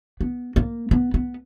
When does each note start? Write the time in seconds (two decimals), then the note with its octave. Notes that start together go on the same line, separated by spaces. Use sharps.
0.21 B3
0.56 A#3
0.91 B3
1.14 B3